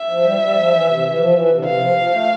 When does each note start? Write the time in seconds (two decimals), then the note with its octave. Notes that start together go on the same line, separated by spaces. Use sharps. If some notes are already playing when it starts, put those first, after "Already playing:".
Already playing: E5
0.09 F3
0.24 G3
0.40 G3
0.56 F3
0.71 E3
0.87 C3
1.02 E3
1.18 F3
1.34 E3
1.49 C3
1.57 D3
1.64 C3 F5
1.80 F3
1.96 F3
2.11 A3